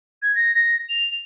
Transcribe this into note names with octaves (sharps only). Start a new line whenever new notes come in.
G#6
A#6
A#6
F7